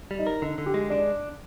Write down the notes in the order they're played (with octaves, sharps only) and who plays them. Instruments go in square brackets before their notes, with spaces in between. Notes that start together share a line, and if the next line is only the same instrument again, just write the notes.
[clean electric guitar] G3
[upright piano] D#4
[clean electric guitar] A#4
[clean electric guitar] D3 [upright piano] D#4
[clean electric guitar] D3
[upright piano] G4
[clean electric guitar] G#3
[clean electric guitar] D4 [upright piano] D5